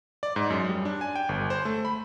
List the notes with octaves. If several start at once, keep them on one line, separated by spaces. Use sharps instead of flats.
D5
G#2
F#2
G3
D4
G#5
G5
G1
C5
A3
B5